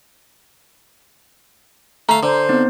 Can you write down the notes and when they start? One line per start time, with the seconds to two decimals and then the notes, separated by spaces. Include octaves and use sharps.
2.09 A3 F5 A#5
2.23 D3 C5
2.49 B3 C4 D#4